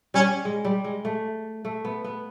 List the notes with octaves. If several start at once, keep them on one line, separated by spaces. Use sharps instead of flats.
G3 C#4
G#3
G3
G#3
A3
A3
B3
B3